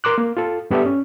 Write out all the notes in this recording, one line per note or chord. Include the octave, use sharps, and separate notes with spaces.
A#4 C6 D6 F#6
A#3
F4 A4
G2 B3 G4 A4 D5 E5
C#4